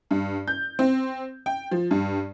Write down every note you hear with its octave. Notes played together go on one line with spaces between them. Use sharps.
G2
G6
C4
G5
F3
G2